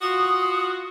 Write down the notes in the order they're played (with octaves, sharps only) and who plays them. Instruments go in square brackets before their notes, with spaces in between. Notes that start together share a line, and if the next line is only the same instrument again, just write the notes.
[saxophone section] F4 F#4 [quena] D#6